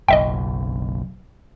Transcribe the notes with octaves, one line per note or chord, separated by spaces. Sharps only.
F#1 B1 D#5 E5 G5